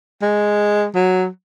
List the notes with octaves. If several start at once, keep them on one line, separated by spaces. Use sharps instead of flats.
G#3
F#3